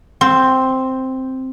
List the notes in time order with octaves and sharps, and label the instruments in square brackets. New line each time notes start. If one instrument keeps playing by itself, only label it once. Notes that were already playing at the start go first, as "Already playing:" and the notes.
[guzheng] C4